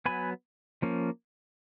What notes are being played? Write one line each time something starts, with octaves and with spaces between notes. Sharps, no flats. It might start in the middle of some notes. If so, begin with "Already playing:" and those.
F#3 B3 G#5 B5
F3 A#3 C#4